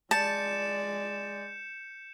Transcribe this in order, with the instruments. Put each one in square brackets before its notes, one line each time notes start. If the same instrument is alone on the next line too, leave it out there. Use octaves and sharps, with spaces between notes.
[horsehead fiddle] G#3 D5 [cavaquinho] A5 [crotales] G6 C#7 E7